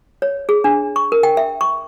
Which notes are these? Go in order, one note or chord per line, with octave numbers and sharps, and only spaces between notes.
C#5
G#4
D4
C#6
A#4
G5
E5
C#6